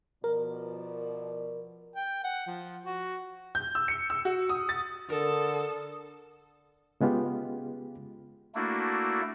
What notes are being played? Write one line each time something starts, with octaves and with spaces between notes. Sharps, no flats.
B2 F3 A#4 D5
G5
F#5
F3
F#4
G6
E6
C#7
E6
F#4
D#6
A6
D3 A4 A#4 D#6
C#3 G#3 B3 F4 G4
A3 A#3 D4 E4 F#4